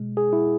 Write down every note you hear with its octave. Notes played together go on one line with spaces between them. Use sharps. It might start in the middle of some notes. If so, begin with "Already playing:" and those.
Already playing: B2 G#3
G#4
E4